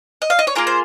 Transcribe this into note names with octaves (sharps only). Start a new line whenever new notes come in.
D#5
F5
D#5
C#5
A#3 F4 G#4 A#4
C5